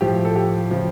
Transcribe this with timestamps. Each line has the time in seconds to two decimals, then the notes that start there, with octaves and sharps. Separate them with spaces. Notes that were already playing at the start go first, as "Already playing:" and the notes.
0.01 A2 F3 G4
0.25 A4
0.36 G4
0.70 C#3 F3